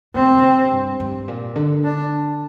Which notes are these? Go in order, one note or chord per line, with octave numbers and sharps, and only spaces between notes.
C3 C4
D3
C3
G2
G2
A#2
D3
D4